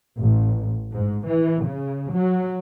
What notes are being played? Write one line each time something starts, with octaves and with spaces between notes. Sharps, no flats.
A1
G#2
E3
C#3
F#3